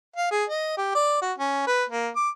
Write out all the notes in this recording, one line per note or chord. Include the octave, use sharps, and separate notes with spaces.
F5
G#4
D#5
G4
D5
F#4
C#4
B4
A#3
D6